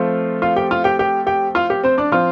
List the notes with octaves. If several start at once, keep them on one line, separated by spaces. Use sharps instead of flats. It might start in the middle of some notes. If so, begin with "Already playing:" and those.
Already playing: F3 A3 C4 F4
F4 F5
G4 G5
F4 F5
G4 G5
G4 G5
G4 G5
F4 F5
G4
C4 C5
D4 D5
F3 C4 F4 F5